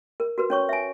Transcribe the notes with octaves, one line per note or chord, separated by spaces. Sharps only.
A#4
F#4 A#4 B4
C#4 C#5 C#6
E5 G#5